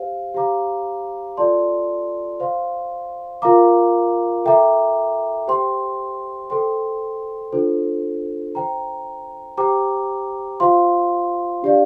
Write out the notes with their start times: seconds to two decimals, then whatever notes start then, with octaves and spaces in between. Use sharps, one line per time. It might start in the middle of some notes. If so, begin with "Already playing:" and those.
Already playing: G4 C5 F5
0.34 G4 C5 F5 A#5 D6
1.37 F4 A4 D5 A5 C6
2.40 C5 F5 C6
3.42 F4 A#4 F5 A#5 D6
4.44 A4 E5 G5 A#5 D6
5.48 G4 C5 G5 C6
6.50 A4 C5 G5 C6
7.52 D4 F4 A4 C5
8.55 C5 G5 A#5
9.57 G4 C5 G5 A#5 D6
10.60 F4 C5 F5 C6
11.63 D4 G4 D5 F5